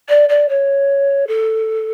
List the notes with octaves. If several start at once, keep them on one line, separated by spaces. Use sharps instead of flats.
D5
D5
C#5
A4